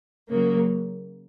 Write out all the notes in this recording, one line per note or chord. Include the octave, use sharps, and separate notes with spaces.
C#3 F#3 A#3